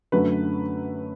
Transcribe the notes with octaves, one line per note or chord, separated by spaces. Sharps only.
F#2 D3 F#3 A3 B4